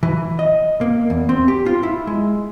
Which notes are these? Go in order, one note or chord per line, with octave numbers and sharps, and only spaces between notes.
E3
D#5
A#3
E2
C4
G4
F4
E4
G#3